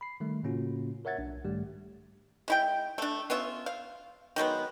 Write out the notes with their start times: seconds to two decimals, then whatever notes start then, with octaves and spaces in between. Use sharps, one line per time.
0.01 B5 C7
0.20 D#3 G3 A3
0.43 A2 C#3 A#3 C#4 F4 F#4
1.05 A#4 C#5 E5 F#5 G#6 A6
1.18 B1 D4
1.45 G#2 D#3 G3 A3 G4
2.48 G#3 E4 G5
2.98 A3 D4
3.30 B3 C#4 F4 E5
3.66 F5
4.36 D#3 F#3 G#3 B3